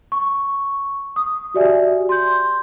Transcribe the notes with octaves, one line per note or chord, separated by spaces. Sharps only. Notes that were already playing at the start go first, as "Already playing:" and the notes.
C#6
D#6
F#4 G4 D5 E5 G#5
C6 G6